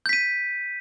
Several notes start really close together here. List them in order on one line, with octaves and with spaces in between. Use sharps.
G6 B6 D#7